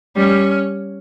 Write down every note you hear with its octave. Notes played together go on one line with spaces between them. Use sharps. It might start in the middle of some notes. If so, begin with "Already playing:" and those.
G3 C#4